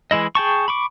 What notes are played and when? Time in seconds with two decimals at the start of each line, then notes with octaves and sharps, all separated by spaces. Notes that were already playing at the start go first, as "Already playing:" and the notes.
0.11 E3 G#3 E4 D#5
0.35 G#4 G5 A5 C#6
0.68 B5 C#6 D6